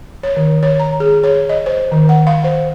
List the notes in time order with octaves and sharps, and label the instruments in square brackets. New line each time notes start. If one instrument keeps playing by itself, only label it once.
[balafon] C#5
D#3
C#5
A#5
G#4
C#5
D#5
C5
D#3
F#5
F5
C5